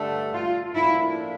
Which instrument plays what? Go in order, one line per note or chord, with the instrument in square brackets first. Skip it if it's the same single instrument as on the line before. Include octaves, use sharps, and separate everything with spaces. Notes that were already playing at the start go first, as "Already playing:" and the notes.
Already playing: [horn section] G2 D3 A3 D4 A4
[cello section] F4
[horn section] A2 F3 A#3 D4 [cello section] E4